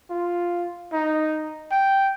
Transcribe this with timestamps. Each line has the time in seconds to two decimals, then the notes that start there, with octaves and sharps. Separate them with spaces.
0.10 F4
0.93 D#4
1.71 G5